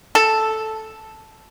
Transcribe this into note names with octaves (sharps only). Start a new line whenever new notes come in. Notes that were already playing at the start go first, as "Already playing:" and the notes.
A4